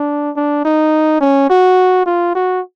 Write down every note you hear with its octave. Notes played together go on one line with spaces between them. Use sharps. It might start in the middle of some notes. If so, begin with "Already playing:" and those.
Already playing: D4
D4
D#4
C#4
F#4
F4
F#4